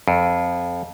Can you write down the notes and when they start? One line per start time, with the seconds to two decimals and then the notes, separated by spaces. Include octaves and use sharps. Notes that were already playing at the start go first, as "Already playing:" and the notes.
0.08 F2